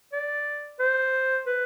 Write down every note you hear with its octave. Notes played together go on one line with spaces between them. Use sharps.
D5
C5
B4